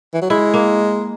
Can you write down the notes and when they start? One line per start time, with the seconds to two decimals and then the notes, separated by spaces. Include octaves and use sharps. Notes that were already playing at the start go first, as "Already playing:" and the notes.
0.14 E3
0.22 F#3
0.30 G#3 E4
0.54 A#3